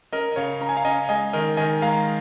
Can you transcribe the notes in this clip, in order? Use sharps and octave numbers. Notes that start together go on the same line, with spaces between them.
C#4 A#4 D#5
D#5
C#3 C#5 F5
C#4 A#5
G#5
F5 A#5
C#4 D#5 G#5
G#3 D#5 G#5
D#3 A#4 D#5
D#3 D#5 G#5
G#3 F5 A#5